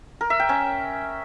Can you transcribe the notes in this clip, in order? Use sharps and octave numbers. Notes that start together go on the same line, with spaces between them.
A#4
E5
G5
C#4